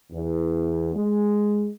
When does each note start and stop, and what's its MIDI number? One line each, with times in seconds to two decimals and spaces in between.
0.12 0.93 40
0.96 1.69 56